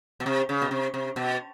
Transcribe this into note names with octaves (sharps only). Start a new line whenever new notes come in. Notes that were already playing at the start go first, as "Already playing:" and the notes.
B2
C3
C#3
B2
C3
C3
B2